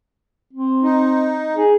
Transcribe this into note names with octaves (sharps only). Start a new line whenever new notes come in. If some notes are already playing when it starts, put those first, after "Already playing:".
C4
D#4
G#4